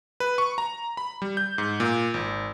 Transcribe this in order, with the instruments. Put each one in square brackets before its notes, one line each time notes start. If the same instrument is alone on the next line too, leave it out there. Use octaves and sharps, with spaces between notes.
[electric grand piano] B4
C#6
A#5
B5
G3
G6
G#2
A#2
G#1